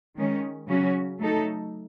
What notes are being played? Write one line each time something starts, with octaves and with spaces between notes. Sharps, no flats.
D#3 G#3 C#4
C#3 F#3 C#4 F#4
F#3 A3 D#4 A4